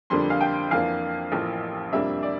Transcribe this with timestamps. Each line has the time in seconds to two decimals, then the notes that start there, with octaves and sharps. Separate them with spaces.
0.10 F2 D3 G3 A#3 D4 C6
0.30 F5
0.41 G5
0.71 F2 E3 A#3 D4 F5
1.32 A1 A2 F3 A#3
1.91 F2 C3 G3 A#3 D4 E5
2.22 D5